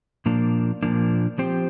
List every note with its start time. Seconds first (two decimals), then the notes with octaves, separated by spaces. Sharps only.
0.26 A#2 F3 A#3 D4
0.83 A#2 F3 A#3 D4
1.38 F3 C4 G4 C5